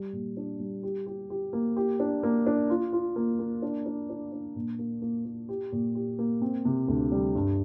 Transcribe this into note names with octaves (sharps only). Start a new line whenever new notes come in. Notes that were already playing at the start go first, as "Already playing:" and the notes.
Already playing: G3
A#2
D4
G3
G4
G4
G4
A#3
G4
D4
A#3
D4
F4
F4
A#3
A#3
D4
D4
D4
D4
A#2
A#3
A#3
A#3
G4
A#2
G4
A#3
C4
C3
D2
G3
G2